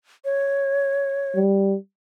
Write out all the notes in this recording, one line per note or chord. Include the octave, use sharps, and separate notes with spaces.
C#5
G3